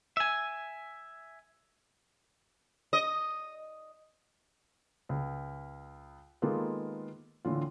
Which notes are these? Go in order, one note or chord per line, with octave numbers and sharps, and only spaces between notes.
E5 G#5
D#5
C#2
D#3 G#3 A#3 B3 F4 A4
A2 D3 E3 F4